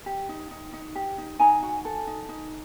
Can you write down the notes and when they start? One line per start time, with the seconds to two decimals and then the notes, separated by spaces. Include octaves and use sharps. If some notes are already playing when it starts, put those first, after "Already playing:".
0.06 G4
0.29 D#4
0.51 D#4
0.73 D#4
0.95 G4
1.18 D#4
1.39 D#4 G#5 A#5
1.62 F#4
1.85 A4
2.07 D#4
2.29 D#4